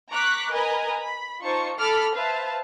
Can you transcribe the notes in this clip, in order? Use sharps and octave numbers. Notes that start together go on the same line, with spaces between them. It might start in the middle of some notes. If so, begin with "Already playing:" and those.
A#5 C#6 D6 F#6 B6
A#4 B4 D#5 G#5 A#5 B5
B5
D#4 F4 C5 A5 C#6 C#7
A4 A5 B5 D6 F6
B4 C5 E5 F5 A5